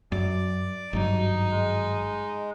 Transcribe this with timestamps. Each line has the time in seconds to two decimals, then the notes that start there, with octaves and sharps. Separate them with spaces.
0.12 F#2 D5 D6
0.93 G#1 G2 F#3 D#4
1.51 G#3